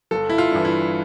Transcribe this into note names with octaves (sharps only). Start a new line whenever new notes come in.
G1 A4
E4
F4
G2 E3
E4